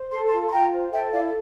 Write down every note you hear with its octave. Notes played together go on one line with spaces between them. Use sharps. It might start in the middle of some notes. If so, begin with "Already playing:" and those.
Already playing: C5
A4 C6
A5 C6
F4
C6
F4 G5 A#5
C5
A4 E5 G5
E4 D5 F5